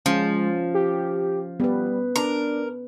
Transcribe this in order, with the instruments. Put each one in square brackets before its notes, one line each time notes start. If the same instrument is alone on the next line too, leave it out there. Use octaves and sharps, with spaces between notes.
[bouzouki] F3 [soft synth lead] G#3 [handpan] C#4
[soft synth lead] G4
[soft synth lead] G3 [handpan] B3 B4
[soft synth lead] D4 [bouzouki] A#4